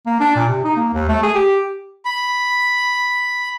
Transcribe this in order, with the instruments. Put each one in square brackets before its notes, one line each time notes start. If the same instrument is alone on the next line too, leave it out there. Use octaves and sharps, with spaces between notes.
[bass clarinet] A#3
D4
A#2
C3
D#4
A#3
D#2
A3
G#4
G4
[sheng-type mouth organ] B5